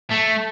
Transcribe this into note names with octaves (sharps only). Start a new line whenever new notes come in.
A3